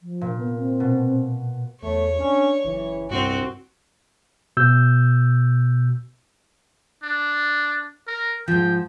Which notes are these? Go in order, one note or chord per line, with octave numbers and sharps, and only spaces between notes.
F3
A#2
B3
C4
B2
E2 A3 C#5
C#4 D4
F#1 E3
C2 G2 C4 F#4
B2 E6 G6
D4
A#4
G#2 F3 G5